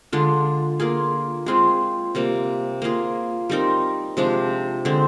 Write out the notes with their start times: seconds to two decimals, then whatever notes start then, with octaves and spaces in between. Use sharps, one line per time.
0.12 D3 G#3 D4 F4
0.80 A#3 F4 G#4
1.46 G#3 C4 F4 G#4
2.15 C3 G3 A#3
2.82 A#3 F4 G#4
3.50 G3 C4 D#4 A#4
4.17 C3 F3 G#3 D4
4.85 D3 G#3 C4